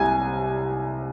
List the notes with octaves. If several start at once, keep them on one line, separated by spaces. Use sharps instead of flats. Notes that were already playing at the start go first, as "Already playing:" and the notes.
Already playing: C2 G#5